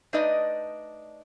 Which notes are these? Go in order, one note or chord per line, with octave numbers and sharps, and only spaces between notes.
A3 D4 D#4 B4 D5 D#5